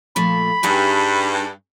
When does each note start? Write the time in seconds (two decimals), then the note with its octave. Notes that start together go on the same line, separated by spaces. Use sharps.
0.16 A#2 F3 A3 B5
0.63 G2 D#4 G#4 G#5